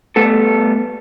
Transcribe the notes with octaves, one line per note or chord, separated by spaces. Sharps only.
G3 A3 B3 A4